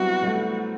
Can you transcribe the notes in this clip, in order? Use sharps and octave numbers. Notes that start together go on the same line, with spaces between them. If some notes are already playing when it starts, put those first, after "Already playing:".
Already playing: F#3 G3 B3 C4 E4 F#4
G3
A3